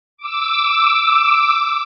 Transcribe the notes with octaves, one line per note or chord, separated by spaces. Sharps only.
D6 E6